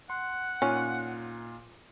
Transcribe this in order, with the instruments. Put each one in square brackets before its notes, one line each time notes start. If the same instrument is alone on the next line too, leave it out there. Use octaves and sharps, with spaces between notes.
[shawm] F#5 [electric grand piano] C6
[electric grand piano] A#2 D#4 F4 [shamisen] C#4